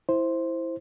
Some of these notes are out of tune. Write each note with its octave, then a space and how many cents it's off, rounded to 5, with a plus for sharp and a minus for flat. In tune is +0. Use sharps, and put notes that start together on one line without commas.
E4 +0 C5 +0